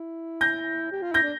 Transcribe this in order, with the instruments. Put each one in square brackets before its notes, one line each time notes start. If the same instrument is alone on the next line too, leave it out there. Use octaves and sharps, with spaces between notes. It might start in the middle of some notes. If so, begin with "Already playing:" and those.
Already playing: [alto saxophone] E4
[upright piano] G6 A#6
[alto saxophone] G4
F4
[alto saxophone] E4 [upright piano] G6 A#6
[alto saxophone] D4